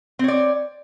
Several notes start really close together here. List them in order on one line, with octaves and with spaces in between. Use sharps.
C4 C#5 D5